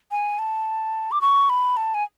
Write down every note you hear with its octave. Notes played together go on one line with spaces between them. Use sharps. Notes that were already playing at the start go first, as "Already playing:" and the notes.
G#5
A5
D6
C#6
B5
A5
G#5